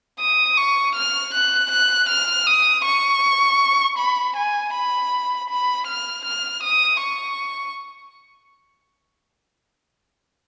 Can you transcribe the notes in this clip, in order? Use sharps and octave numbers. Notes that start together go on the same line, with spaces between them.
D#6
C#6
F6
F#6
F#6
F6
D#6
C#6
B5
G#5
B5
B5
F6
F6
D#6
C#6